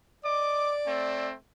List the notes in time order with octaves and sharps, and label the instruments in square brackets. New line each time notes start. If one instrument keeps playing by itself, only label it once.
[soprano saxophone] D5 [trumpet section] D#5 D6
[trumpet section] A3 C4